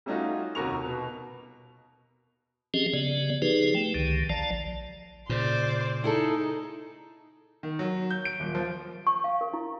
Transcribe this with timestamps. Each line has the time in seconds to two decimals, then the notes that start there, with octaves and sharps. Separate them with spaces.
0.06 G3 A3 C#4 D#4 F4 F#4
0.55 F1 D#2 F#4 A#4 C#6 F7
0.85 B2
2.74 F3 C4 C#4 G4 G#4 D#5
2.93 C#3 B3 D5
3.42 F3 D#4 G4 G#4 B4
3.75 A3 G5
3.94 C#2 D3 D#3
4.29 A#1 F3 D5 A5
5.29 A#2 C#3 C5 D5
6.04 D#4 E4 G#4 A4
7.63 D#3
7.79 F#3
8.10 G6
8.25 D7
8.40 D#1
8.55 F3
9.07 C#6
9.24 F5
9.41 A#4
9.53 E4